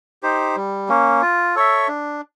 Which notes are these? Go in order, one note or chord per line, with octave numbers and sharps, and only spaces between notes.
D#4 G4 C5
G3
A#3 C#4
F4
A4 C#5 E5
D4